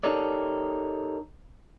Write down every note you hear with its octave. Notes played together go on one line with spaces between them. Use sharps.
D#4 G4 A4 A#4 C#5 D5